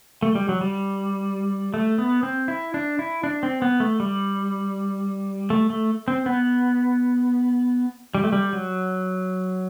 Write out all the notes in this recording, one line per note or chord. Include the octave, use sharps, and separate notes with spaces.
A3
G3
F#3
G3
A3
B3
C4
E4
D4
E4
D4
C4
B3
A3
G3
A3
A3
C4
B3
G3
A3
G3
F#3